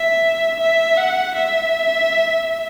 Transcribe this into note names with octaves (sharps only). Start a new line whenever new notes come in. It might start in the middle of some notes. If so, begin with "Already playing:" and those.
Already playing: E5
E5
F#5
E5